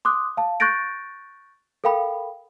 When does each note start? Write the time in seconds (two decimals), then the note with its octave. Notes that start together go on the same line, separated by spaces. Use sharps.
0.05 C6 D6 D#6 F#6
0.37 F5 A5
0.60 C#6 F#6 G6 A6 A#6 D7
1.84 A4 A#4 F5 G5 B5